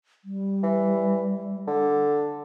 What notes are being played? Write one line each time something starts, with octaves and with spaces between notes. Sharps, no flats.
G3
E3
D3